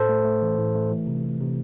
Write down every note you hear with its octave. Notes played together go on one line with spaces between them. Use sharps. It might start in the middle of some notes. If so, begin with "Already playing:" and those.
Already playing: A2 A4 C5
A3
A3
E3
A2
A3
E3
C3
A3
C3